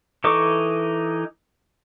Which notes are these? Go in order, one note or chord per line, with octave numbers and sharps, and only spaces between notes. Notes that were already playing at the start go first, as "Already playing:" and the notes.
E3 D#4 A4 C#6 D6